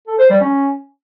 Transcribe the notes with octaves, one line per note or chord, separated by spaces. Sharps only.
A4
C5
G3
C#4